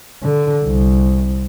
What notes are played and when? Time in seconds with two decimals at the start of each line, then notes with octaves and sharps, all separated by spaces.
0.23 D3
0.65 C2